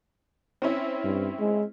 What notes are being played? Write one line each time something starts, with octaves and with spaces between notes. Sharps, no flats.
C4 C#4 E4
G2
G#3